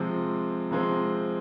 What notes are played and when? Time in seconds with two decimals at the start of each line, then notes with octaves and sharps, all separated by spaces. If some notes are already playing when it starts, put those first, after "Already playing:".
Already playing: C3 F3 G#3 C4
0.71 C3 F3 G#3 C4